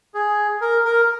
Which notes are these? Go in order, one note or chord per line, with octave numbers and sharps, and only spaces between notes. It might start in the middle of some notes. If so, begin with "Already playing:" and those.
G#4
A#4
A#4